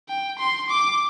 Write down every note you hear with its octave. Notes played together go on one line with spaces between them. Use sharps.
G5
C6
D6